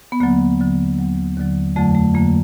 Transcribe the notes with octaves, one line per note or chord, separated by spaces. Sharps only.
B3
D#2 D3 F#3 A#3
D#2 D3 F#3
D#2 D3 F#3
D#2 D3 F#3
F2 D3 F#3 A3
A3
F2 D3 F#3 A#3